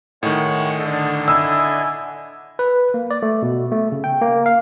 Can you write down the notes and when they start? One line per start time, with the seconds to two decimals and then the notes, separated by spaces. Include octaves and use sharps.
0.23 A2 D#3 G#3 C#5 F#5
0.80 D3 A4 D#5
1.28 E4 D#5 G#5 E6
2.59 B4
2.94 A#3
3.11 D5
3.22 A3
3.42 B2
3.72 A3
3.92 C#3
4.04 G5
4.22 A#3
4.46 F5